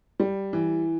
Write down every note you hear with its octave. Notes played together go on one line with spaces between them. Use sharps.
G3
E3